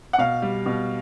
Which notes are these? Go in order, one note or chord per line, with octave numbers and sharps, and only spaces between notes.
F#5
B2 F5
G3
B2